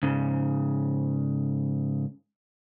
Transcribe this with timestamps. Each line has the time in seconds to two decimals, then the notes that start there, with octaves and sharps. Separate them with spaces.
0.03 G#2 C#3